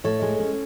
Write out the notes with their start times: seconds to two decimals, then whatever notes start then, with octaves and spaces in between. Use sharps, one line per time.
0.04 A2 A4 C#5
0.22 G#3
0.40 C#4